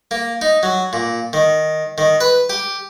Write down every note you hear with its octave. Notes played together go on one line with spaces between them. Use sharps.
A#3
D#4
F#3
A#2
D#3
D#3
B4
G4